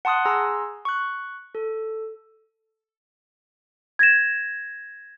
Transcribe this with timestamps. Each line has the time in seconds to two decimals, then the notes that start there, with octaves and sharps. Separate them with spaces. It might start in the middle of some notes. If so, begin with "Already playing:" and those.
0.05 F#5 A5 C6 D#6 F#6
0.25 G#4 G#5 A#5 C6 E6
0.85 C#6 F#6
1.55 A4
3.99 G#6 A#6 E7